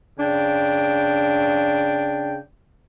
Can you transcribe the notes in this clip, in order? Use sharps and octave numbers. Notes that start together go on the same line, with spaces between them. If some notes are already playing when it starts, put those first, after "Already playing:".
C#3 D4 G5